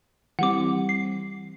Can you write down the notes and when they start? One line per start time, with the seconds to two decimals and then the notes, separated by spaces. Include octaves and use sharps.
0.39 E3 G3 C4 F#5 D6
0.89 C7